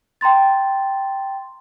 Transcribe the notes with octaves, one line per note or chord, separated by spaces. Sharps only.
G5 A#5 C6 A6